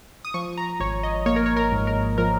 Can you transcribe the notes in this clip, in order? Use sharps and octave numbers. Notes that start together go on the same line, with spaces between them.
D#6
F3 C#6
A#5
G#1 C#5
D#5
A#3 C#5
A#4
C#5
A#4
G#2
A#4
F3 A#4